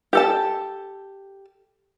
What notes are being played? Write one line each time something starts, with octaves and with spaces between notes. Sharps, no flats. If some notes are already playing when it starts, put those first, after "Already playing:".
G4 A4 A5